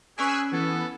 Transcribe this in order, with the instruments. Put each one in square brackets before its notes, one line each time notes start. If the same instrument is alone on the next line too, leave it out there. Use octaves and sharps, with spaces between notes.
[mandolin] C#4 B4 D5 [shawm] G#4 [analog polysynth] G#5 E6 F#6
[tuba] E3 [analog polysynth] B3 [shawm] A4